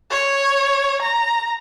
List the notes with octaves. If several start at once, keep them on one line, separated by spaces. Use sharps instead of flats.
C#5
A#5